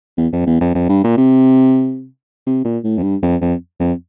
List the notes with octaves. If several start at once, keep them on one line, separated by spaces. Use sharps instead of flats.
E2
F2
E2
F2
F2
G2
A#2
C3
C3
A#2
A2
F2
G2
F2
F2
F2